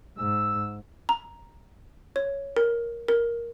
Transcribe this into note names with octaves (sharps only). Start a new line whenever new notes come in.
G#2 E6
A#5
C#5
A#4
A#4